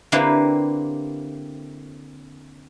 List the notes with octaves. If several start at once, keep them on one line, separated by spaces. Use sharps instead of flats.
D3 A#3 C4 E4 G4 B4